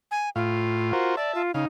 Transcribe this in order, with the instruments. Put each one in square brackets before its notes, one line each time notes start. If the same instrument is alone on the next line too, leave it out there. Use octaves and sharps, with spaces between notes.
[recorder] G#5
[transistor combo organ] A2 F5 [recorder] F4
[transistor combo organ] F#4 A#4 C5
[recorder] D5 [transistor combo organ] E5 A5
[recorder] F4
[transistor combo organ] C#3 F5 [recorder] D#4